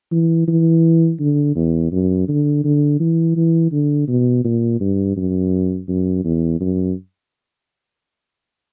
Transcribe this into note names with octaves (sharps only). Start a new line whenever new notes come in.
E3
E3
D3
E2
F#2
D3
D3
E3
E3
D3
B2
A#2
G2
F#2
F#2
E2
F#2